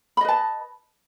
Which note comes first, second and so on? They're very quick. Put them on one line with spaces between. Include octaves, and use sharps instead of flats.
B5 D#5 B4 A5